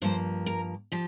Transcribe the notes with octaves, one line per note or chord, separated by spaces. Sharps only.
G2 F3 A#3 C5
A#4
F3 G4